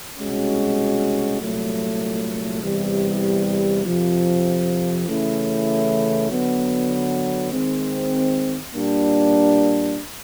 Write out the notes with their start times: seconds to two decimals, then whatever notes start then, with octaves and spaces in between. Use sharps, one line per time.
0.17 C2 B2 G#3 C#4 F#4
1.39 C2 A#2 F#3 A3
2.62 E2 C3 E3 G3
3.85 F2 C3 F3
5.07 C#3 E3 A3 C#4 E4
6.29 D3 F#3 B3
7.52 D#3 G#3 C4
8.75 A#2 G3 A#3 D4